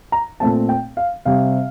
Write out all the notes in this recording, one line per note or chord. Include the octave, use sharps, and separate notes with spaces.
A#5
A#2 A3 C4 A5
G5
F5
C3 G3 C4 F5